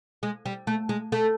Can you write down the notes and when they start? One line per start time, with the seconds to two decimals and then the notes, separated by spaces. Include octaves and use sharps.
0.23 G#3
0.46 G3
0.67 A3
0.89 G#3
1.12 A3